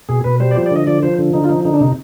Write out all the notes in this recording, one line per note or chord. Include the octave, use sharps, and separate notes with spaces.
B2 G#4
B2 B4
G3 C5
D5
F3 C5
D5
D3
D#5
F3 D5
F3 C5
D3
D3 D#4
F4
F3 D#4
D3 D#4
D4
C3 D#4